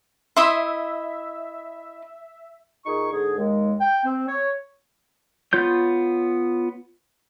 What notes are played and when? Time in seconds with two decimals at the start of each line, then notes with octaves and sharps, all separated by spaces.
0.37 E4 D#5 E5 C6
2.86 A#2 D#4 G#4 C#6
3.12 G#2 D3 G#4
3.38 D#2 G#3
3.81 G5
4.05 C4
4.28 C#5
5.53 B3 F4 C#5 G6